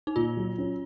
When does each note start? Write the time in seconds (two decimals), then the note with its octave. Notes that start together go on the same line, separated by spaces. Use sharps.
0.07 D#4
0.16 A#2 F4
0.37 F#3
0.58 C#4